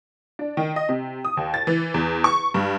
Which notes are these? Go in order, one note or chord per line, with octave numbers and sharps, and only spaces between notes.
D4
D#3
D#5
C3
D#6
D#2
A6
E3
E2
C#6
G2